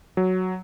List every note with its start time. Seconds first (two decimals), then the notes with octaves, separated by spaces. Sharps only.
0.17 F#3